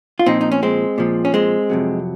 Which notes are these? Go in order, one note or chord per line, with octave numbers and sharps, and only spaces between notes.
F4
A#2 F3 C4 D#4
D#4
C#4
G#3 C4
A#2 F3
C#4
G#3 C4
F2 C3 F#3